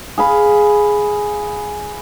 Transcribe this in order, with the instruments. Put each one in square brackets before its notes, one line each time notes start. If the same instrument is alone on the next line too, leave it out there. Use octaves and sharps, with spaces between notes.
[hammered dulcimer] G#4 F5 B5